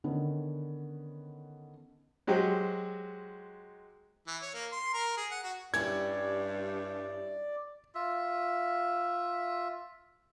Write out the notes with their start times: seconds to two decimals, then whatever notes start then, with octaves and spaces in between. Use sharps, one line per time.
0.04 D3 D#3 B3 C#4
2.27 F#3 G#3 F#4 G4 C5
4.28 E3
4.42 C#5
4.54 A#3
4.72 C6
4.94 A#4
5.17 G#4
5.31 F#5
5.44 F#4
5.74 G2 G3 C#4 E4 D5 G#6
7.95 F4 E5